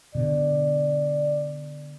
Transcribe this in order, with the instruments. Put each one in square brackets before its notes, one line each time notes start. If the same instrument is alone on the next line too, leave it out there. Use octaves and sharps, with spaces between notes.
[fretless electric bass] B2 D3 [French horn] D5